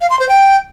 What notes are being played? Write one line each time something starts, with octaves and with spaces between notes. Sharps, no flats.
F5
C6
C5
G5